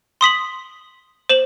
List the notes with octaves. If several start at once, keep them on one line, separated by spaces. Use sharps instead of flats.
C6 D#6 B6 F#7
C5 E7 F#7